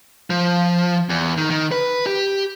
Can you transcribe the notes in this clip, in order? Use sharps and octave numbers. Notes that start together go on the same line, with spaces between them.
F3
E2
D#3
D#3
B4
G4